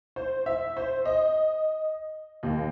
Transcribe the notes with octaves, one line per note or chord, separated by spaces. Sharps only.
C5
E5
C5
D#5
D#2